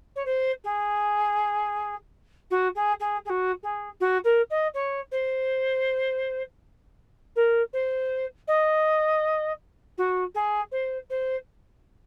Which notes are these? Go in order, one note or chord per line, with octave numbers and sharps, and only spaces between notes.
C#5
C5
G#4
F#4
G#4
G#4
G#4
F#4
G#4
F#4
A#4
D#5
C#5
C5
A#4
C5
D#5
F#4
G#4
C5
C5